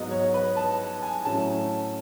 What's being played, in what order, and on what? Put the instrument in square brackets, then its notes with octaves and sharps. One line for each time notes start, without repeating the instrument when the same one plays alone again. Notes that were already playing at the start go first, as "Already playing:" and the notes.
Already playing: [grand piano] G#2 F#3 B3 D#5
C#5
B4
A5
G#5
A2 F#3 A3 C#4 A5